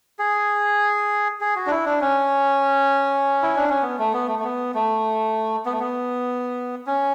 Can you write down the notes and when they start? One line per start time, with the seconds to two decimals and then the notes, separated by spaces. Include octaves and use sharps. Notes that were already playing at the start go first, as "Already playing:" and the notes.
0.19 G#4
1.41 G#4
1.56 F#4
1.66 D4
1.71 E4
1.86 D4
2.01 C#4
3.42 E4
3.56 D4
3.70 C#4
3.83 B3
3.99 A3
4.13 B3
4.28 A3
4.39 A3
4.44 B3
4.74 A3
5.66 B3
5.72 A3
5.80 B3
6.87 C#4